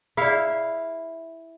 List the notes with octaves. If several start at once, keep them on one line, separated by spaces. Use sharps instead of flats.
E4 G#4 D5 E5 F5